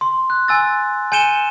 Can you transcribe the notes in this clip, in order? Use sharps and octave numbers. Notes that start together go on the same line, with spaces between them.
C6
F#6
G#5 E6 A6
G#5 G6 C#7 D#7 E7 G7